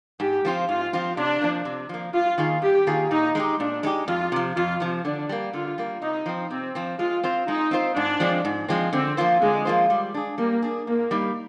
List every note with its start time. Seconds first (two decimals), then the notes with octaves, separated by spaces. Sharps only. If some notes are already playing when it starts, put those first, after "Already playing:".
0.20 G#2 G4
0.45 F3 C4 F4
0.69 G#2 F4
0.93 F3 C4 F4
1.17 C3 D4
1.41 F3 A#3
1.65 C3
1.89 F3 A#3
2.13 G2 F4
2.38 D#3 A#3 F4 G#4
2.62 G2 G4
2.87 D#3 A#3 F4 G#4
3.11 A#2 D#4
3.35 G#3 D#4 G4
3.59 A#2 D4
3.83 G#3 D#4 G4
4.08 F2 F4
4.32 C3 F3
4.56 F2 F4
4.80 C3 F3
5.05 D3 D4
5.29 G3 A#3
5.53 D3 F4
5.78 G3 A#3
6.02 C3 D#4
6.26 F3 C4
6.50 C3 C4
6.75 F3 C4
6.99 G#3 F4
7.24 C4 F4 C5
7.47 G#3 D#4
7.71 C4 F4 C5
7.96 G#2 D4
8.20 F3 G#3 C4
8.45 G#2
8.69 F3 G#3 C4
8.93 D3 C4
9.17 F3 A#3 F4 C5
9.41 D3 G#3
9.65 F3 A#3 F4 C5
9.90 G3
10.14 D4 G#4
10.38 G3 A#3
10.62 D4 G#4
10.87 G#2 A#3
11.11 G3 A#3 D#4